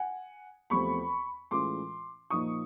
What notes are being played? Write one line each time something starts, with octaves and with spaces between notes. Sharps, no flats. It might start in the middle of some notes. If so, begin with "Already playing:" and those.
Already playing: F#5 G#5
E2 C3 F3 A3 C4 B5 C#6
A2 E3 G#3 C#4 F4 C6 D6
A#2 F3 A#3 D#4 C#6 D#6